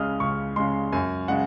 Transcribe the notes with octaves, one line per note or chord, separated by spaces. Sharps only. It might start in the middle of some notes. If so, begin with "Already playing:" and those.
Already playing: C#2 C#3 G#3 D#6 F6
C#2 C#6
C#3 G#3 C6
F#2 G#5
C#3 G#3 F#5